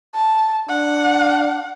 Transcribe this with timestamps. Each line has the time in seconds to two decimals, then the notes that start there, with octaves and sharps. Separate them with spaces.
0.15 A5
0.69 D4 F#5